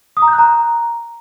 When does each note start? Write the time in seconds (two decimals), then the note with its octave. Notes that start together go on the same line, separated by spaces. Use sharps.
0.17 D#6
0.22 A#5
0.28 G6
0.33 F#6
0.39 A#5